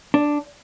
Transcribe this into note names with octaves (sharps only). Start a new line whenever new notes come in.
D4